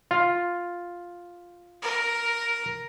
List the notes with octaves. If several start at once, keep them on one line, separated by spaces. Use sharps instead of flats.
F4
A#4